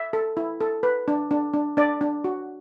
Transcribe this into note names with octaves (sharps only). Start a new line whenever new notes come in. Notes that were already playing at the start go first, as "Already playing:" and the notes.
Already playing: E5
A4
E4
A4
B4
D4
D4
D4
D4 D5
D4
F#4